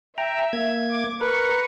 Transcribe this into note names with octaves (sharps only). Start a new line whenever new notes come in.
E5 G5 A#5
A#3 G#6
D6
A#4 B4 A#5 C#6 C#7